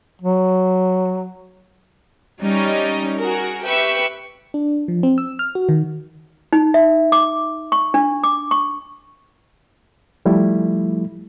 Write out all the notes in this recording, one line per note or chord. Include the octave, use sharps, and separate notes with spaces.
F#3
G3 C#4 D#4 D#5
F#4 G#4 A#4
G4 B4 E5 C#6 E6
D4
F3
C4
E6
F6
F#4
D#3
D#4
E5
D6
C#6
D4
D6
C#6
F3 G3 A3 E4